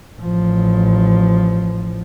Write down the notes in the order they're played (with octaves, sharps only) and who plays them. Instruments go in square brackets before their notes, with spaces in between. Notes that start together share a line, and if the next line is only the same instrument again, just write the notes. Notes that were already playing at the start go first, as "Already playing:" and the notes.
[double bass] A1 F3